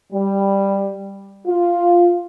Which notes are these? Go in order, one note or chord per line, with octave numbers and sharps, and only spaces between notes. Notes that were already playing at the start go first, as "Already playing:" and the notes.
G3
F4